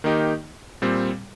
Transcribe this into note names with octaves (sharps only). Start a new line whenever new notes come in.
D#3 A#3 D#4 G4
A#2 G3 C4